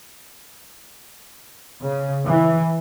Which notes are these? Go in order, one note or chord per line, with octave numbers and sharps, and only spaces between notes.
C#3
E3